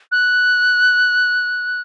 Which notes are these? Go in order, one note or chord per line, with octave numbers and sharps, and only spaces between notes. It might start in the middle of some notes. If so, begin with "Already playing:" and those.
F#6